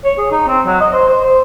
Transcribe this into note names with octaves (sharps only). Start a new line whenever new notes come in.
C#5
G#4
D#4
C4
F#3
D#5
C5
C5
C5